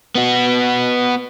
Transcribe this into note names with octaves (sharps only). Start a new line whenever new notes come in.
B3 F#4